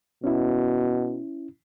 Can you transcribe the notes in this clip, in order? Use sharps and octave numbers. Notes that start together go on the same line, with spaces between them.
B2 C#4 E4